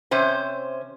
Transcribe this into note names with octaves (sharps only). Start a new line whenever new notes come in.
C3 C#4 C5